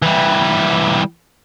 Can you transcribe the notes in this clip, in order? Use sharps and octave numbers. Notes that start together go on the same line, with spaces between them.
E3 G3